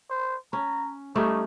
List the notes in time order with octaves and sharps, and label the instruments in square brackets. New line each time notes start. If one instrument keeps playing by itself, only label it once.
[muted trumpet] C5
[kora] C#4 [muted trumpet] A#5
[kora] G3 A3 C#4 [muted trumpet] D#4